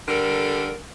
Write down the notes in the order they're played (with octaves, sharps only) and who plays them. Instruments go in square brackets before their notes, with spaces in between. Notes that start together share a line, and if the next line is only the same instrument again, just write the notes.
[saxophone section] D3 G3 A4 A#4